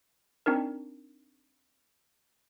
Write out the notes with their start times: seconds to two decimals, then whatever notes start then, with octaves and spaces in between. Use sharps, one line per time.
0.46 C4 D4 D#4 A#4